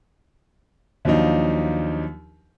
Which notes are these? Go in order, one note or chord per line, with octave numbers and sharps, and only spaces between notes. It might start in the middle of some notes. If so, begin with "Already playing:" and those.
D#2 F3 F#3 D4 D#4